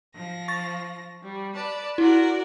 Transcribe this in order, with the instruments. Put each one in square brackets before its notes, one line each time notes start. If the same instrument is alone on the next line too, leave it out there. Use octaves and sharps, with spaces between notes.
[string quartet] F3 A#6
[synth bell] C#6 A6
[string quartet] G3
B4 D5 A5
[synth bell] E4 [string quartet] F#4 A#4 D5